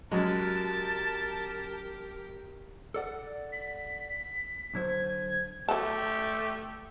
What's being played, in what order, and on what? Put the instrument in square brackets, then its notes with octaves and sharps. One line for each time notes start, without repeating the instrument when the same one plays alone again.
[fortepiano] F#2 G#3 [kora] F#3 [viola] G4 A#4 [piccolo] A5
[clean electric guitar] A4 D5 F#5
[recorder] B6
[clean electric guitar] D3 F#3 C5 [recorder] G#6
[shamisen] F#3 A5 [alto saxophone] A3 [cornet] G4